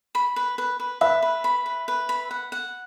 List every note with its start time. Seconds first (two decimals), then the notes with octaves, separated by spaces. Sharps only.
0.15 B5
0.36 B4
0.58 B4
0.80 B4
1.01 B4 E5
1.22 B4
1.44 B5
1.66 B4
1.88 B4
2.09 B5
2.31 F#5
2.52 F#5